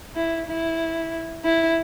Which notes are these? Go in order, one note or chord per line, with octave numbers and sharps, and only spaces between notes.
E4
E4
E4